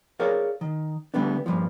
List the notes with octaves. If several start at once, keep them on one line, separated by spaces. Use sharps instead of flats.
G#4 A#4 C#5 D5 F5
D#3
D3 G3 A3 B3 D4
G2 A#2 F3